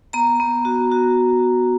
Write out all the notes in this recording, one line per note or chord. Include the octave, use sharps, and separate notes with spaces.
B3 A#5
B3
F#4
F#4